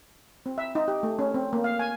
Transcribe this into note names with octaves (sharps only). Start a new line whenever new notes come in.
C4
E5
D#4
G4
A3
C#4
C4
A#3
F5
G#5